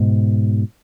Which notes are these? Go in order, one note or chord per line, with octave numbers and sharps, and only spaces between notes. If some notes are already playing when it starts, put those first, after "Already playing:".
Already playing: G#2 B2